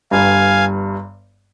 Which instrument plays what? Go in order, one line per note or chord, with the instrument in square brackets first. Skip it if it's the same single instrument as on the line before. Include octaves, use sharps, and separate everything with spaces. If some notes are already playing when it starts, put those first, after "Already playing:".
[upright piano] G1 G2 G3 [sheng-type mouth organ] F5 G#5